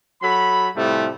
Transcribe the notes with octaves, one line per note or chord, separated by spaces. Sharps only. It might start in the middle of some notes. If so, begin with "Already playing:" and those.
F#3 A4 B5
A2 C3 F3 G3 A3